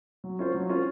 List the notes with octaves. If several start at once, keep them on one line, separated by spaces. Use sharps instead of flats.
F#3
C#4 F4 C5
F#3
C#4 F4 C5